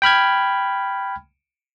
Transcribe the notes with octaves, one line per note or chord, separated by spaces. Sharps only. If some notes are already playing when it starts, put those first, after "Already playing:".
G5 B5 F6 G#6